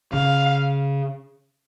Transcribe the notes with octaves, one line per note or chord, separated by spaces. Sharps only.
C#3 F5